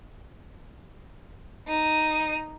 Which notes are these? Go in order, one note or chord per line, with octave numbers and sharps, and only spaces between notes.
D#4 D#7